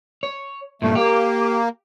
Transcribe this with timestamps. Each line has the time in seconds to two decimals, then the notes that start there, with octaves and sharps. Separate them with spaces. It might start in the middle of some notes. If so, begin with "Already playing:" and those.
0.23 C#5
0.82 G2 A#2 A3
0.95 A#3 G4